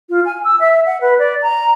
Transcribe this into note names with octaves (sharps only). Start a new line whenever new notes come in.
F4
G#5
E6
E5
F#5
B4
D5
A#5